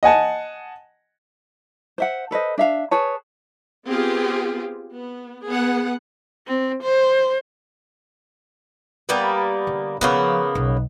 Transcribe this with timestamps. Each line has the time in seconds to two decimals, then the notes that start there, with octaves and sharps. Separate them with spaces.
0.03 D#5 F#5 G#5 A5
1.98 C5 E5 F#5
2.31 A4 B4 C5 D#5
2.58 D4 E5 F5
2.91 G#4 B4 C#5 A5
3.86 B3 C4 F4 G4 G#4
4.92 B3
5.46 B3 G#4 F#5
6.47 C4
6.83 C5
9.09 G3 A#3 B3
9.67 D3
10.01 C#3 F3 A#3 B3
10.55 B1